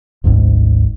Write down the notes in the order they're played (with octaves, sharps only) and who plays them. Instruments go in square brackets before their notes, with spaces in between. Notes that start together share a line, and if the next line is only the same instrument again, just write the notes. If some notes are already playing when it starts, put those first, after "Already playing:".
[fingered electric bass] G#1 D2 G#2